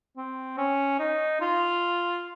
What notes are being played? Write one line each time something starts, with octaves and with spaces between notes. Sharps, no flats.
C4
C#4
D#4
F4